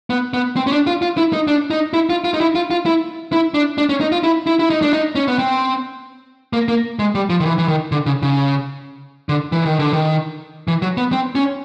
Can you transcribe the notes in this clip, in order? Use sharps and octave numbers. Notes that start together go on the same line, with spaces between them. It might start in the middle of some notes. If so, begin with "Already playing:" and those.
B3
B3
C4
C#4
D4
F4
F4
E4
D#4
D4
D#4
E4
F4
F4
D#4
E4
F4
F4
E4
E4
D4
D4
C#4
D#4
F4
E4
E4
E4
D#4
D4
D#4
C#4
B3
C4
A#3
A#3
G#3
G3
F3
D#3
E3
E3
D#3
D3
C#3
C#3
D3
E3
D#3
D3
D#3
E3
F#3
B3
C4
C#4